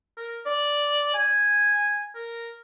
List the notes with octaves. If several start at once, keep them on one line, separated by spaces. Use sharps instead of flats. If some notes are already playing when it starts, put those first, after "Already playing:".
A#4
D5
G#5
A#4